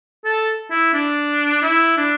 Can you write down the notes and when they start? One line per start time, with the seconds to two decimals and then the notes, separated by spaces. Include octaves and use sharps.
0.25 A4
0.70 E4
0.93 D4
1.62 E4
1.97 D4